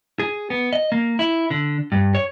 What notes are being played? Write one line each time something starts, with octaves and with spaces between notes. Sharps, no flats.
G#4
B3
D#5
A#3
E4
D3
G2
C#5